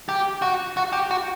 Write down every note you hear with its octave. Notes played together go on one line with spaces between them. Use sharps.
G4
F#4
F#4
G4
F#4